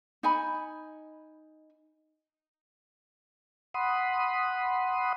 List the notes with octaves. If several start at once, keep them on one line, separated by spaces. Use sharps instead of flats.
D#4 G#5 B5
F#5 B5 C6 D#6